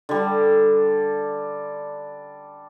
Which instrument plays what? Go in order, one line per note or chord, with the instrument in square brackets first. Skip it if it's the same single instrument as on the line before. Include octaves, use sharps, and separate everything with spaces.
[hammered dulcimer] D3 G3